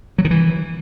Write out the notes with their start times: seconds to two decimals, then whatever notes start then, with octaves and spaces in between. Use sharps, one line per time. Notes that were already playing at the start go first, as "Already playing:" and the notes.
0.18 F#3
0.25 D#3
0.31 E3